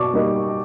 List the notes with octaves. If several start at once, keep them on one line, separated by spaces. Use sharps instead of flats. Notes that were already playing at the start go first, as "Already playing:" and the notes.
Already playing: B2 D5 C#6 D6
G3 A#3 D#4